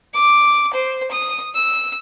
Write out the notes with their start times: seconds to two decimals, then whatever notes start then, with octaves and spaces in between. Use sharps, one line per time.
0.14 D6
0.73 C5
1.11 D#6
1.55 E6